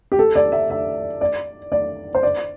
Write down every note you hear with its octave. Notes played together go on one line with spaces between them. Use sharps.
G4
A4
D5
E5
E5
D5
D5
C5
D5